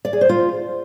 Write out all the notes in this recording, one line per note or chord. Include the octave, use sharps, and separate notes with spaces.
D5
G#4
C5
F4